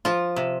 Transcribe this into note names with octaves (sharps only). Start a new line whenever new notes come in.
F3 F4
C3